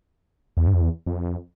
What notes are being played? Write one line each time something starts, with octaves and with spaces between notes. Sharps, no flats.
E2
G2
F2
E2
F2